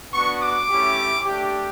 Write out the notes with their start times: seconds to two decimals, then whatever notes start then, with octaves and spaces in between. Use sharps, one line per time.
0.13 B3 D4 F#4 C#6
0.42 D6
0.70 A3 C#4 E4 G4
1.26 A3 D4 G4